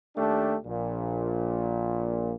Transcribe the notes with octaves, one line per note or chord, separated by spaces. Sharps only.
D#2 A3 D4 G4
A#1 A#2